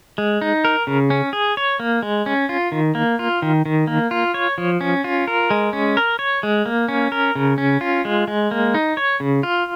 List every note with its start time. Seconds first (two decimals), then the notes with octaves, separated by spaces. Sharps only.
0.18 G#3
0.41 D#4
0.65 A#4
0.87 C#3
1.10 C#4
1.33 G#4
1.57 C#5
1.80 A#3
2.02 G#3
2.26 C#4
2.49 F4
2.72 D#3
2.95 A#3
3.19 F4
3.42 D#3
3.65 D#3
3.87 A#3
4.11 F4
4.34 C#5
4.58 F3
4.81 C#4
5.04 F4
5.27 A#4
5.51 G#3
5.73 C#4
5.97 A#4
6.19 C#5
6.43 G#3
6.66 A#3
6.88 C#4
7.12 A#4
7.35 C#3
7.58 C#4
7.81 F4
8.05 G#3
8.28 G#3
8.51 A#3
8.74 D#4
8.97 C#5
9.20 C#3
9.43 F4